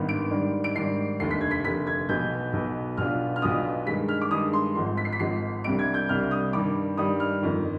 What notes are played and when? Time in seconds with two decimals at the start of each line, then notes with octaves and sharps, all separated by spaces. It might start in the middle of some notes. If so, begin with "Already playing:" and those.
Already playing: G#1 G2 D#3 B3
0.09 D7
0.31 G#2 D#3 G3 D4
0.64 D7
0.75 G#2 D#3 G3 D4 C7
1.20 F1 D#2 D3 C7
1.31 B6
1.41 G#6
1.51 B6
1.64 F1 D#2 D3 B6
1.87 G#6
2.09 B1 B2 B3 G6
2.53 B1 B2 B3
2.97 B1 B2 B3 D4 F4 F6
3.36 F6
3.42 B1 B2 B3 D4 F4 D#6
3.86 G2 D#3 G#3 B6
4.09 F6
4.21 D6
4.31 G2 D#3 G#3 D#6
4.53 C6
4.75 G#1 G#2 F3 C6
4.97 B6
5.05 C7
5.13 B6
5.20 G#1 G#2 F3 C7
5.64 C2 C3 G3 D4 D7
5.79 G#6
5.94 G6
6.09 C2 C3 G3 D4 F6
6.31 D#6
6.53 G2 D#3 G3 D6
6.97 G2 D#3 G3 D#6
7.20 F6
7.42 G1 F2 D#3